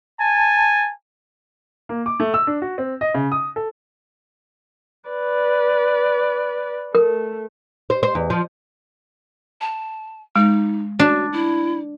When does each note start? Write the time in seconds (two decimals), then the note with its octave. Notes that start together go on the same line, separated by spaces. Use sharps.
0.20 G#5 A5
1.89 A#3
2.06 D6
2.20 A3
2.34 E6
2.47 D4
2.62 F#4
2.78 C4
3.01 D#5
3.14 C#3
3.32 D#6
3.56 A4
5.10 B4 D5
6.95 A3 A#4
7.90 C5
8.03 C5
8.15 E2
8.30 F3
9.61 A5
10.36 G#3 D#4
10.99 D4 F#4
11.33 E4